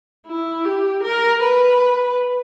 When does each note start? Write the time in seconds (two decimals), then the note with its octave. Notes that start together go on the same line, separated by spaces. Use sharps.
0.27 E4
0.65 G4
1.03 A#4
1.43 B4